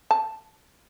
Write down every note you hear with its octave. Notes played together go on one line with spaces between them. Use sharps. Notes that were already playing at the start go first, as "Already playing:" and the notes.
A5